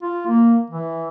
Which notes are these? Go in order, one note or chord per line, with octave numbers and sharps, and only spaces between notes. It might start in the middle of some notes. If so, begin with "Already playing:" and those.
F4
A#3
E3